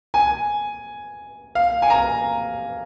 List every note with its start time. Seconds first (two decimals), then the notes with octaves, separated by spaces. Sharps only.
0.14 G#5
1.55 F5
1.82 G#5
1.90 A#5